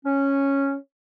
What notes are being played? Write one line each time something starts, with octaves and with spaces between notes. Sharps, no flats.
C#4